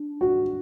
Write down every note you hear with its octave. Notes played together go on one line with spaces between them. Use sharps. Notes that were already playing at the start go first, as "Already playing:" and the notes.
Already playing: D4
F#4